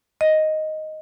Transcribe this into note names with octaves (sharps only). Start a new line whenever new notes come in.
D#5